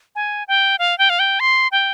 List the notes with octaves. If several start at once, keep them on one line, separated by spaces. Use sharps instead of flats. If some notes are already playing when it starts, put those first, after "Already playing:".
G#5
G5
F5
G5
F5
G5
C6
G5